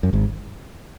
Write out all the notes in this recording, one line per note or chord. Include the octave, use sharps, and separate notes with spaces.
F#2
G#1 G#2